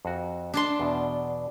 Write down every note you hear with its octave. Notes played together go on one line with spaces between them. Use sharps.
F2 F#4
D4 A5 C6
E2 B2